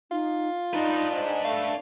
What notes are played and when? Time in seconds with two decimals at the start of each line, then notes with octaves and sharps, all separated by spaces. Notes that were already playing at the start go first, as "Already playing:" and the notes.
0.11 D#4 F4
0.74 D4 D#4 B4 D#5
1.12 G#2
1.44 A3 F5